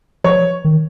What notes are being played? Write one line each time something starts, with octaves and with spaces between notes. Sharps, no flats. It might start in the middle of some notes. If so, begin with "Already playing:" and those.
F3 C#5
D#3